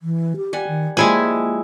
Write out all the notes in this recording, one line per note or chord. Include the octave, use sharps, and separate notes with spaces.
E3
G4
G3 F#5 G#5
D#3
F3 G3 G#3 A#3 E4 A#4 G#5